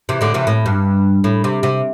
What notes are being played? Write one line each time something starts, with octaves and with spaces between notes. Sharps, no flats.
C3 E3
A2 D3
C3 E3
A2
G2
A2
C3
C3